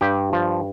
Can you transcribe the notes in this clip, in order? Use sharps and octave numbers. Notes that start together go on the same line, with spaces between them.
G2 G4
F3